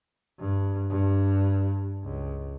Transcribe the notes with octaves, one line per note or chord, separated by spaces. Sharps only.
G2
G2
C#2